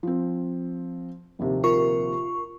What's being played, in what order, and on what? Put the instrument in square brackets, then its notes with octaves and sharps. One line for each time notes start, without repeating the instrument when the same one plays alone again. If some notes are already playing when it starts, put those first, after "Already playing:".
[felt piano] F3 C4
A#1 D#2 C3
[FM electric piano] F4 A#4 C#6